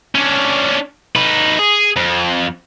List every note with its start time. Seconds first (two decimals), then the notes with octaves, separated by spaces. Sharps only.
0.15 C#4 D4
1.16 D#4 B4
1.59 G#4
1.96 F2